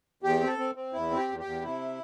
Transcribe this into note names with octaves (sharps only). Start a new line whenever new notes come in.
E2 G4
C4
A4
C4
C4
E2 E4
C4
G4
E2
G4
E2
C3 E4